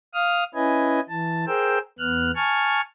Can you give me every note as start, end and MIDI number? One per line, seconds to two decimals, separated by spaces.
0.14 0.44 77
0.14 0.44 87
0.14 0.44 89
0.55 1.00 61
0.55 1.00 64
0.55 1.00 71
0.55 1.00 75
0.55 1.00 80
1.09 1.45 52
1.09 1.45 81
1.47 1.78 68
1.47 1.78 70
1.47 1.78 72
1.47 1.78 79
1.47 1.78 88
1.99 2.31 40
1.99 2.31 59
1.99 2.31 89
1.99 2.31 90
2.36 2.81 80
2.36 2.81 81
2.36 2.81 85
2.36 2.81 89